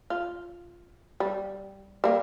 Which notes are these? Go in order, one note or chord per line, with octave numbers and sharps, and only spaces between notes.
F4
G3
G3 A#3